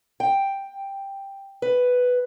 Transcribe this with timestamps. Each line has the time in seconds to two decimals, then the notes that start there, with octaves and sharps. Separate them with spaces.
0.20 G5
1.62 B4